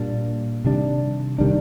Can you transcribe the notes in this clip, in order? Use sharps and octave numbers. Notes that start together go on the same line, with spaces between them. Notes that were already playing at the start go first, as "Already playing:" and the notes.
Already playing: A#2 G3 A#3 D4
C3 D#3 G3 D4
C3 D#3 G3 D4